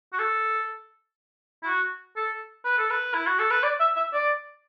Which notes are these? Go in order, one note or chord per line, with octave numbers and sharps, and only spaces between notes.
F#4
A4
E4
F#4
A4
B4
A4
B4
E4
F#4
A4
B4
D5
E5
E5
D5